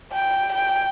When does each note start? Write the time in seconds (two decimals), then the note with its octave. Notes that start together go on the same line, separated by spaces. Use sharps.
0.12 G5
0.53 G5